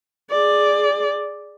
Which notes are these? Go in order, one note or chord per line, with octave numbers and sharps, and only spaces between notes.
G#4 D5